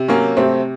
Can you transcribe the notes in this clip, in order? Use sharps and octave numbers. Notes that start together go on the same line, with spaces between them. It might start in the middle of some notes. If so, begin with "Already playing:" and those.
Already playing: C3
F#3 A#3 C#4
C3 A3 C4